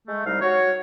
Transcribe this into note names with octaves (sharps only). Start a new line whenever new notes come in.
G#3 A3
C2 G3 G#3 D#4 F5
F#4 C#5